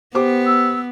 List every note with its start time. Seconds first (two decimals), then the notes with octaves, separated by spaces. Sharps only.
0.15 B3 G4 C5 D6
0.46 E6